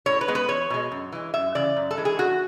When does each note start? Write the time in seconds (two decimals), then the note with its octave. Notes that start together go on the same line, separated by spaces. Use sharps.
0.06 A2 C#5
0.21 B4
0.28 G#3 B3
0.35 B4
0.48 E2 C#5
0.70 B2 G#3
0.92 F#2
1.12 E3 G#3
1.34 F#2 E5
1.55 C#3 E3 D5
1.76 F#2
1.91 A4
1.97 E3 G#3
2.05 G#4
2.19 E2 F#4